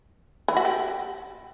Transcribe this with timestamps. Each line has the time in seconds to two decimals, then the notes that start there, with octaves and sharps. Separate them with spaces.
0.48 E3
0.57 F#4
0.65 G4